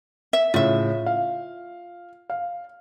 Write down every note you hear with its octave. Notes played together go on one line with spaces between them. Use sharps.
E5
A2 C#3 F4 E5
F5
F5